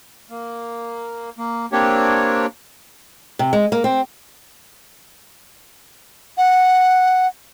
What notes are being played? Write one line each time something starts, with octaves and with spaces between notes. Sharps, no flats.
A#3
A#3
A#3 C4 D4 G4 C#5
C3
G#3
A#3
C4
F#5